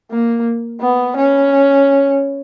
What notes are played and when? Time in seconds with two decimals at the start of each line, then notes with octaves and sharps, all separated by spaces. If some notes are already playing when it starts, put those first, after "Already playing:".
0.11 A#3
0.81 B3
1.17 C#4